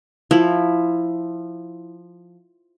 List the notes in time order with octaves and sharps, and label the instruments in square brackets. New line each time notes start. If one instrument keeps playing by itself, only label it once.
[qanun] F3 E4